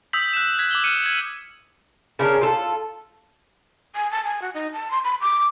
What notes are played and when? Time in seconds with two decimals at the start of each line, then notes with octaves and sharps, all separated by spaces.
0.13 D#6 E6 G6 B6 F#7
0.33 F#6 E7
0.58 F#6 G#6 B6 F#7
0.71 D6 F#7 G7
0.84 F6 F#6 C#7 D#7
1.06 G#6 C#7
2.19 C#3 C#4 D4 A#4
2.41 F4 A4
3.96 G#5
4.12 A5
4.24 G#5
4.42 F#4
4.54 D#4
4.73 A5
4.91 C6
5.04 B5
5.21 D6